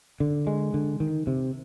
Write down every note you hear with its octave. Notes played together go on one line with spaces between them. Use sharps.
D3
G#3
D3
D#3
C3